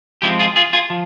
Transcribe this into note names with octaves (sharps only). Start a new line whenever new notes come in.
F3 G#3 C4 E4 G4
F4 G#4
F4 G#4
F4 G#4
F3